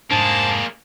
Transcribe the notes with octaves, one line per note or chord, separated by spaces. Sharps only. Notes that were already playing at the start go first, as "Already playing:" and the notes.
F1 G#2 A#3 D4 G#4 C5 A5